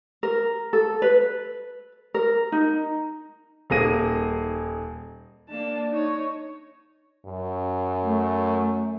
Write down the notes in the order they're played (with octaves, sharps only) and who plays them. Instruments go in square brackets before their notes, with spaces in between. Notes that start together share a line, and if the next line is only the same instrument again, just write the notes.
[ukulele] A#4
A4
B4
A#4
D#4
[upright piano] D#1 A#3 G#4 A#6 D#7
[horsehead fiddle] A#3 A5 [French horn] D4
[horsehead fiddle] D#4 C#5
[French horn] F#2
[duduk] A3